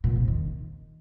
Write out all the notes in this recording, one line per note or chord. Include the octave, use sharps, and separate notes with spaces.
A#2
F2
D#3